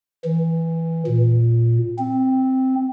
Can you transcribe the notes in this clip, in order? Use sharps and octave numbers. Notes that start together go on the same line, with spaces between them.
E3
A#2
C4